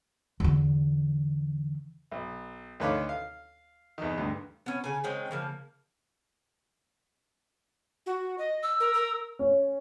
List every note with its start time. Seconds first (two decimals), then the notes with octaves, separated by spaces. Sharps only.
0.40 E2 D3
2.11 B1
2.80 D2 D#3 B4 C#5 F5 D6
3.09 F5
3.98 E2 D#3
4.18 D2 G2
4.66 B3 C#4
4.84 C#3 G#5
5.04 D#3 G#3 C4 C#4
5.31 C#3 F3 A#3
8.06 F#4
8.38 D#5
8.63 E6
8.80 A#4
8.94 A#4
9.39 C#4